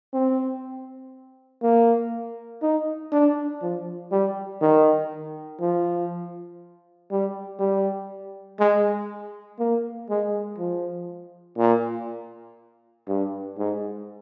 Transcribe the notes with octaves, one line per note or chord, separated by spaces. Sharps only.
C4
A#3
D#4
D4
F3
G3
D#3
F3
G3
G3
G#3
A#3
G#3
F3
A#2
G2
G#2